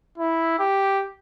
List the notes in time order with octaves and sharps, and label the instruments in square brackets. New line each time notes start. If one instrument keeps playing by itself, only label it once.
[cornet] E4
G4